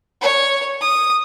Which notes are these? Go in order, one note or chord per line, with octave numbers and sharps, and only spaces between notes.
C#5
D#6